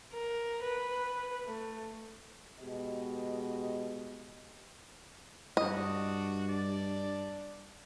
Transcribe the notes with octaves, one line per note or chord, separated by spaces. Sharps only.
A#4
B4
A3
B2 G#3 G4 D#5
G2 D4 F#4 D#5
D4 D5